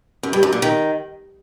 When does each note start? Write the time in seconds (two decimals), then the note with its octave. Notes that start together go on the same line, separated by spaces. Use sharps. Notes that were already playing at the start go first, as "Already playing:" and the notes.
0.23 F#2
0.33 G2
0.43 F#2
0.52 A#2
0.62 D#3